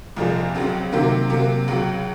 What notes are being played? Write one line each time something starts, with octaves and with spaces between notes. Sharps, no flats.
C2 A#2 F3 G#3
C#2 C#3 F#3 C4
C3 D#3 F#3 A#3
C3 F#3 A#3
C#2 C#3 F#3